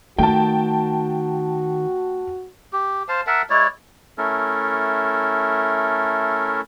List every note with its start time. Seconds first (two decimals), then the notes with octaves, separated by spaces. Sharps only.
0.19 D#3 A3 F#4 G5 A5
2.73 G4
3.09 C5 F5 A5
3.27 A#4 E5 F#5 A5
3.50 G#3 E4 C#5 D5
4.18 A3 C#4 E4 A4 A#4